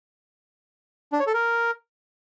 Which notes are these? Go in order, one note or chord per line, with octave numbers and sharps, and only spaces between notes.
D4
C#5
A4
A#4